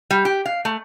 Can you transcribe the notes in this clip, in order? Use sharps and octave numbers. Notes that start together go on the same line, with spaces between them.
G3
G4
F5
A3